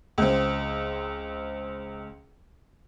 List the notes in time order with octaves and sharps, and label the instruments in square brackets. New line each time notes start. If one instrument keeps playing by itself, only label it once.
[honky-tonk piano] C#2 C4